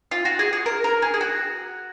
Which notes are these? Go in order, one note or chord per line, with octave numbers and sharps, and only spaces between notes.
F4
F#4
G#4
G#4
A#4
A#4
G#4
G#4
F#4